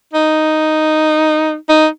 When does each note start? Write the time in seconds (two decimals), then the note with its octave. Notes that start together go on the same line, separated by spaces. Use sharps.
0.13 D#4
1.69 D#4